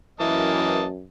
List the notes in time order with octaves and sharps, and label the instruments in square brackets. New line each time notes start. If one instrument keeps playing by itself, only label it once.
[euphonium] F#2 [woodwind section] E3 [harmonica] A#3 D#5 A5